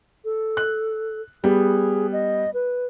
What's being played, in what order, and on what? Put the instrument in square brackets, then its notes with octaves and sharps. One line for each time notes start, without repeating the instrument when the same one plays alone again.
[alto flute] A4
[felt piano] F#6
[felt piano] G3 B3 [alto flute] G#4
[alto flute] D#5
B4